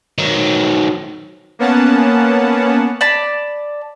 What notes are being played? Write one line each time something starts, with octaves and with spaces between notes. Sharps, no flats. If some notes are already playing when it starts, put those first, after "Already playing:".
D#3 F#3
A#3 B3 C#4 F#5 A5
D5 A5 B5